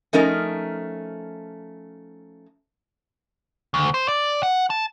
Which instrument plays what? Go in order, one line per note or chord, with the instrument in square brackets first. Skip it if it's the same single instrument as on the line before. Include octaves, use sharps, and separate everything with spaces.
[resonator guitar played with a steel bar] F3 A3 C#4 D#4 A#4
[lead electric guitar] D2
C5
D5
F#5
A5